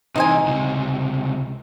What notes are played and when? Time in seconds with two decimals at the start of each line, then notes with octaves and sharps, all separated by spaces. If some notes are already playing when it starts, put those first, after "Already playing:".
0.16 C3 E3 D#4 C5 G#5
0.46 C#2 C3